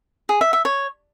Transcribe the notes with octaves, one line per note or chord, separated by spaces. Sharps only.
G#4
E5
E5
C#5